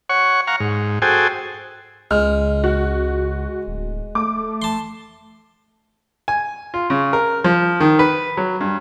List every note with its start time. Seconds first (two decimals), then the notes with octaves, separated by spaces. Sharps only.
0.09 C#5 F#5 C#6
0.47 F5 F#5 A#5 C#6
0.60 G#2
1.02 F#4 G#4 A4 C5 G5 G#5
2.11 C#2 G#3 F6
2.64 F#4
3.67 D1
4.15 A3 D6
4.62 A5 C6
6.28 G#5
6.74 F4
6.90 C#3
7.13 A#4
7.44 F3
7.80 D#3
7.99 B4
8.37 F#3
8.61 G2